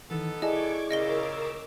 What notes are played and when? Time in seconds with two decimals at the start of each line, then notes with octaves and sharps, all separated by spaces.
0.11 D#3 E3 B3 D#4 A4
0.42 E4 G#4 D5 D#5 A5 C#6 D6 G#6
0.91 A#2 C#3 A#4 D#5 D6 E6 A#6 G7